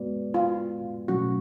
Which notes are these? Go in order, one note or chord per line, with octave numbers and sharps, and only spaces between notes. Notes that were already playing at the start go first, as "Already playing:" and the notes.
Already playing: G#3 B3 F#4 B4 D5
F4
B2 F#3 A3 C#4 F#4